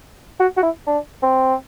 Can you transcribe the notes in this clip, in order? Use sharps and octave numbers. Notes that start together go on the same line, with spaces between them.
F#4
F#4
E4
D4
C4